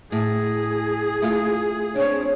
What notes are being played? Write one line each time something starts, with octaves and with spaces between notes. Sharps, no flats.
A2 G#4
A3 F4
C4 D4 C#5